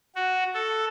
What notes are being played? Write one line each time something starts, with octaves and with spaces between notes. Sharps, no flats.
F#4
A4